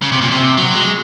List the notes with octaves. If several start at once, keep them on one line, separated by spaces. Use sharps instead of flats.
C#3
C3
A#2
C3
F#3
G#3